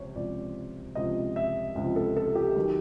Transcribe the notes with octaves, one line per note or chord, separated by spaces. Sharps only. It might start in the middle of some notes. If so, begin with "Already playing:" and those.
Already playing: C#2 C3 F3 C5 C#5
C#2 C3 F3 D5
C#2 C3 F3 D#5
E5
C#2 C3 F3
A4
A4
G4
D#3 F#3